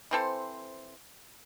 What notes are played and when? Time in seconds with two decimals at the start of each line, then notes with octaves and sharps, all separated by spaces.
0.11 E3 C4 A4 C5